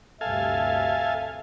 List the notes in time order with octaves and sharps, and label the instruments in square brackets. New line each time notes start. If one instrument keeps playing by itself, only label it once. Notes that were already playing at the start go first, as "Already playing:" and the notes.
[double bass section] D2 G2 C3 [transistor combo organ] A4 F5 G#5 [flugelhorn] E5